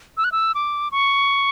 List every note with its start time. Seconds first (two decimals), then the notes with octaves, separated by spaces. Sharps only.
0.17 E6
0.24 F#6
0.32 E6
0.55 D6
0.92 C#6